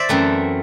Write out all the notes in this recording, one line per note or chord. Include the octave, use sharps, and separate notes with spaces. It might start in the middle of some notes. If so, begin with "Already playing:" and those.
Already playing: C5 D5 E5
F#2 E3 A3 C4